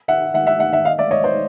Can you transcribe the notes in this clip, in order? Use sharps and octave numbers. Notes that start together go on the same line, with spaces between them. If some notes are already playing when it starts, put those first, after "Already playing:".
E5 F#5
E5 F#5
E5 F#5
E5 F#5
E5 F#5
D#5 F5
D5 E5
C#5 D#5
C5 D5